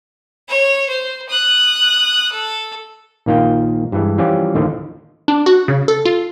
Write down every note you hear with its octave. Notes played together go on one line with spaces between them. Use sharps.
C#5
C5
D#6 F#6
A4
A#1 D#3 A#3 F4 G5
G2 E3 G#3
E3 F3 G3 C#4 F4 G4
D#2 A2 D3 D#3 F3
D4
F#4
C#3
A4
F4